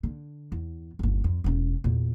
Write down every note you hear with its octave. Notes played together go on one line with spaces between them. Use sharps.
D3
E2
G1 D#2
F2
E1 C#4
E2 A#2